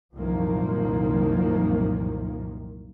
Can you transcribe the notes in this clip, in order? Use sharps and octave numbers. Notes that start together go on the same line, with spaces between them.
C2 F#2 A#2 D#3 F3 A#3